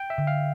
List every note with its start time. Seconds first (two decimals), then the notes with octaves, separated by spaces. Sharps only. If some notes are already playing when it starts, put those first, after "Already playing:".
Already playing: G5
0.10 E5
0.18 D3
0.27 F5